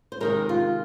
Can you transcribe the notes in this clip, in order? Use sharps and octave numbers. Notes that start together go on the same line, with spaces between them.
C5
C3 D#3 G#3 A#4
F4